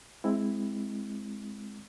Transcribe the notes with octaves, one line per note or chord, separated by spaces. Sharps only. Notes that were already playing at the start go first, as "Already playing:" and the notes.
G#3 C4 E4